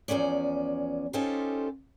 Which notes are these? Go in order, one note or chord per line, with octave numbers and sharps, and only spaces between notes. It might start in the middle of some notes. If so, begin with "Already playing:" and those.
E2 E3 F3 C#4 D5
C#4 D#4 F4 G4 A4 C5